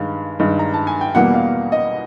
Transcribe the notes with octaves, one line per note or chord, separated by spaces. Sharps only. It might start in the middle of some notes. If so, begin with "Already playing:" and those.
Already playing: G2 D#3 G#3 F5
G2 D#3 G#3
A#5
A5
G#5
G5
E2 B2 G3 A#3 F#5
F5
D#5